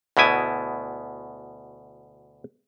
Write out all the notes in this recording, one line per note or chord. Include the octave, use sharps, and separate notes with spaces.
D2 B2 B3 E4 G#5